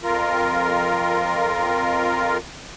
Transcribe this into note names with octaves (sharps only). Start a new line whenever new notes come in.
F2 F4 A#4